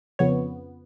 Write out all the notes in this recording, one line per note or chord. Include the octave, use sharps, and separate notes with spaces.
F2 C#3 F3 B3 C#5